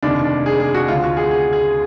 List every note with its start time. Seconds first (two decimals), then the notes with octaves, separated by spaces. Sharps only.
0.03 F1 D#2 D#3 D4
0.24 D4
0.46 G#4
0.60 G#4
0.75 F#4
0.88 D2 D3 F3 F4
1.03 F#4
1.17 G#4
1.31 G#4
1.53 G#4